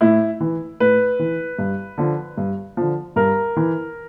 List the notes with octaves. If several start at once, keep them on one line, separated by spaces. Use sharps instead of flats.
A2 E4
E3
A2 B4
E3
G2
D3 F3
G2
D3 F3
G2 A#4
E3